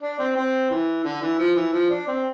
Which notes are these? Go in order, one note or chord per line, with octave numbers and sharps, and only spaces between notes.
D4
C4
C4
E3
D3
E3
F3
E3
F3
D4
C4